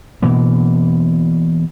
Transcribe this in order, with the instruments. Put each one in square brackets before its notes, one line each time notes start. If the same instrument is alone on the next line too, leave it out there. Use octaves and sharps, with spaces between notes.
[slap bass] B2 E3 A#3